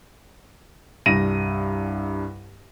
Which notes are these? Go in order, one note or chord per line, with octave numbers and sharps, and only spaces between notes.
C2 G2 A#6 D#7